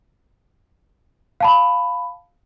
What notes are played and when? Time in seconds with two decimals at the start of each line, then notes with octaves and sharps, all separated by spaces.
1.40 F5 A5 B5